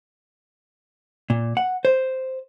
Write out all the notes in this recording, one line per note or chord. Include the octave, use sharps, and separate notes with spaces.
A#2
F#5
C5